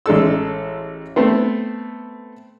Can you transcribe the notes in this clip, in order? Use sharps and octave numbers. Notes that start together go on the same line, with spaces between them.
A1 G#3 A4 E6
A3 B3 C4